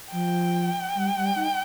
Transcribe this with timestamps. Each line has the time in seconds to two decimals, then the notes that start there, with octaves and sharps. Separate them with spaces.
0.12 F3 G5
0.95 G3
1.16 G3
1.36 D#4